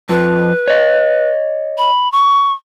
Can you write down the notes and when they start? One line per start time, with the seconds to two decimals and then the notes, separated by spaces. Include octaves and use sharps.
0.09 F2 F3 B4
0.68 C#5 D#5
1.78 B5
2.12 C#6